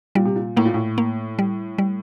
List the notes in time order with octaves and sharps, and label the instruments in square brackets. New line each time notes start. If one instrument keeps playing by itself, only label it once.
[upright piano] A#2 [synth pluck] G3
[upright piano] C3
A#2
[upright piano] A2 [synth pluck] A#3
[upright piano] A#2
A2
[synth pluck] A#3
G3
G3